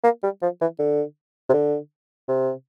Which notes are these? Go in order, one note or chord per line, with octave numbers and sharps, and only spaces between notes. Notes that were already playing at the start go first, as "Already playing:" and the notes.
A#3
G3
F3
E3
D3
C3
D3
C3